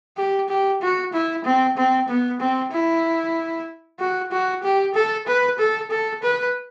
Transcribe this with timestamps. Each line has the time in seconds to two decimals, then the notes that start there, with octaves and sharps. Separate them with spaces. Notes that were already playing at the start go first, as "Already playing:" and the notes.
0.17 G4
0.49 G4
0.82 F#4
1.13 E4
1.44 C4
1.77 C4
2.09 B3
2.40 C4
2.72 E4
4.00 F#4
4.32 F#4
4.63 G4
4.95 A4
5.27 B4
5.59 A4
5.91 A4
6.23 B4